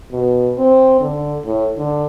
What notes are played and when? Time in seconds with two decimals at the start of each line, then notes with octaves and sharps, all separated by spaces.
0.11 B2
0.58 C4
1.00 D3
1.45 A2
1.77 D3